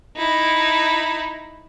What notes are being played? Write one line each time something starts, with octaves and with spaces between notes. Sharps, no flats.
D#4 E4